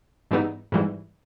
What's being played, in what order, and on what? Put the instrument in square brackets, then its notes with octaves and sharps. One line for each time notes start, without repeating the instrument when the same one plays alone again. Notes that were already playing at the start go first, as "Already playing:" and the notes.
[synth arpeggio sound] G#2 E3 G3 B3 D#4
G#2 E3 G3